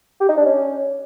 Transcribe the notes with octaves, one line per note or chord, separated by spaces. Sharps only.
G4
D#4
D4
C#4